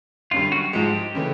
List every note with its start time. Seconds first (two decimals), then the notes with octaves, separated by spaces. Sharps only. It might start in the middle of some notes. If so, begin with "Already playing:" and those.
0.31 F#2 D3 G3 F4
0.52 F#4
0.73 G#2 F3 G#3 G4
1.15 C#3 E3 A3